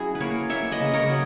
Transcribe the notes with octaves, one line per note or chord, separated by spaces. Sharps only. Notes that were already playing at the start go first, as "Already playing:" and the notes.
Already playing: F#3 C#4 E4 G#4
B4
A#3 A#4 C#5
A#3 C#5 E5
B4 D#5
C#3
A#4 C#5
F#3